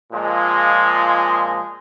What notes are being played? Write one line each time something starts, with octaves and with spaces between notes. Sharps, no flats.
A#2 F3 G#3